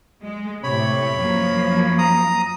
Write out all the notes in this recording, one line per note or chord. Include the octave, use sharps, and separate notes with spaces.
G#3
A2 C3 C#5 B5
F#2 F3 A#3
A#5 D#6